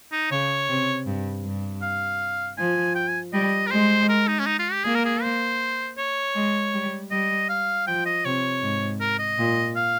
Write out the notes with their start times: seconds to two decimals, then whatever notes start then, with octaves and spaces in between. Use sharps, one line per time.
0.12 D#4
0.31 C#3 C#5
0.69 C3
1.06 G2
1.44 G2
1.82 F5
2.58 F3 G#5
2.95 G5
3.08 G#5
3.33 G3 D#5
3.67 A#4
3.71 G#3 C5
4.09 A#4
4.27 D#4
4.39 C#4
4.47 D#4
4.59 F4
4.72 G4
4.84 A#3 G#4
4.95 A#4
5.05 G#4
5.22 C5
5.98 C#5
6.35 G#3
6.73 G3
7.11 G3 D#5
7.49 F5
7.87 F3 G5
8.06 D#5
8.25 C3 C#5
8.62 G#2
9.01 A#4
9.19 D#5
9.39 A#2
9.76 F5